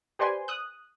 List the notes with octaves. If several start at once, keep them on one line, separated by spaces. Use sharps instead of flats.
G4 B4 C5 D5 G#5 C6
D#6 F#6